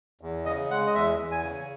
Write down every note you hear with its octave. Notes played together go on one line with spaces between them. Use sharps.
E2
C#3 D#5
G#3 F#5
D#5
E2 E5
E2
G#5
C#3